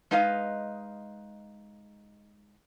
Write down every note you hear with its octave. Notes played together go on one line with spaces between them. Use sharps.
G#3 D#4 B4 D#5 F5